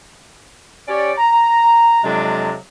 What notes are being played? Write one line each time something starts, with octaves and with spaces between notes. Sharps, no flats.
C#4 G4 C#5 D5
A#5
F2 C3 F#3 G#3 D4